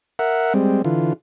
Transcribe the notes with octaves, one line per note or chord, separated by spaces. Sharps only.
A#4 E5 F#5
G3 G#3 C4
D3 E3 F4